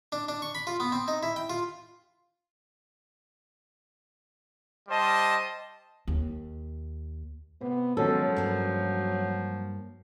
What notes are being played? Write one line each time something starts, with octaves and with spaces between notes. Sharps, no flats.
D4
D4
C#6
B5
F4
B3
C4
D#4
E4
G5
F4
G3 C5 D#5 A5
D#2
C3 B3
B2 D#3 F3 F#3 G#3 C#4 A4
G2 A#3